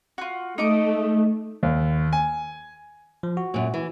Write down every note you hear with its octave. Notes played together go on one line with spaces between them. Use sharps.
F4 F#4
A3 D#4 D#5 D6
D#2
G#5
F3
F#4
F#2 A#2
E3